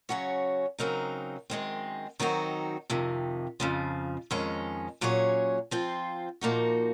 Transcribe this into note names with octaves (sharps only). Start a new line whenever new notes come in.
C#3 F#3 C#4 F#4 C#5
C#3 F#3 C4 D#4 A#4
F#2 D#3 G#3 C4
D#3 F#3 C4 D#4 F#4
F2 C3 D#3
F2 C#3 F3
F2 D#3 G#3 C#4
A#2 F#3 C#4 G#4 C#5
F3 C4 F4 C5
A#2 F3 A#3 D#4 F#4